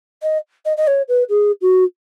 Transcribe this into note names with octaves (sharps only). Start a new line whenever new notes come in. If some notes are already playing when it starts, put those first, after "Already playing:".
D#5
D#5
D#5
C#5
B4
G#4
F#4